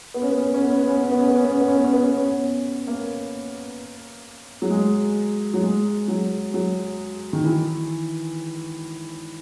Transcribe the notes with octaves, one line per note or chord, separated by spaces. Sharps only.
B3
C#4
B3
C#4
B3
C#4
B3
C#4
B3
C#4
B3
C#4
B3
C#4
B3
C#4
B3
C#4
B3
C#4
B3
C#4
B3
C#4
B3
C#4
B3
A#3
F#3
G#3
F#3
G#3
F#3
F#3
D#3
E3